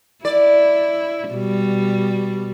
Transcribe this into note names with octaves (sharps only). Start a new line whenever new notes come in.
E4 D5
B2 G3